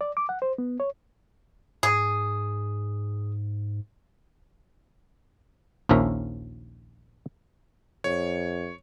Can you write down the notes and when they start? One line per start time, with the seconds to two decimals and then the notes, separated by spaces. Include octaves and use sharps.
0.01 D5
0.17 D6
0.29 F#5
0.42 C5
0.58 B3
0.80 C#5
1.83 G#2 G#4
5.89 A#1 D#2 F3 C#4 A#4 E5
8.04 F2 C#5